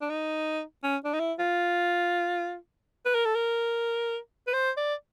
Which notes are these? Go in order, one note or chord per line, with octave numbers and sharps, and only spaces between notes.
D4
D#4
C#4
D4
D#4
E4
F4
B4
A#4
A4
A#4
B4
C5
D5